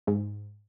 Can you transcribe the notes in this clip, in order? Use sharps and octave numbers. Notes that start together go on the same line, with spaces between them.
G#2